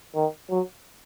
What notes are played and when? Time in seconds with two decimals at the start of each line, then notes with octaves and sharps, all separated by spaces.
0.15 D#3
0.50 F#3